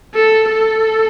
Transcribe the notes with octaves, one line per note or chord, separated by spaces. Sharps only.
A4
A4